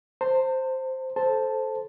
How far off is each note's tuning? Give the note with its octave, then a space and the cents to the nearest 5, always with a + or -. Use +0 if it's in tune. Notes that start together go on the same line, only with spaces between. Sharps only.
C5 +0 A5 +45
A4 -15 C5 +0 A5 +0